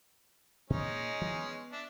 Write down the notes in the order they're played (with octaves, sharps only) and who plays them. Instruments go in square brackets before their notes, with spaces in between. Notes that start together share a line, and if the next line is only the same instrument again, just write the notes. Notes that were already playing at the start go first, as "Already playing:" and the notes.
[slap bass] A#2 [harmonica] G#3 C#4 D#4
[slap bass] E3 F#3 A3
B3
[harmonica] D4 E5